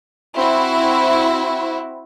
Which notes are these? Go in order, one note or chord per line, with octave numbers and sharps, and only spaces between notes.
C4 E4 F#4